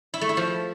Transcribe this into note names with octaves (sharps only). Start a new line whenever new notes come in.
E4
A3
E4
F3